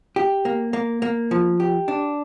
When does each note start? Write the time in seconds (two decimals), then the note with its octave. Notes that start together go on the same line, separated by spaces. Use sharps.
0.16 G4
0.45 A#3
0.73 A#3
1.02 A#3
1.31 F3
1.60 G4
1.88 D4